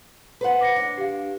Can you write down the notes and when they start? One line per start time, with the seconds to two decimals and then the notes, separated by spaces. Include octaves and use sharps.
0.41 B4 C5 F#5
0.61 D6 A#6 C#7
0.76 D4
0.98 G4 F5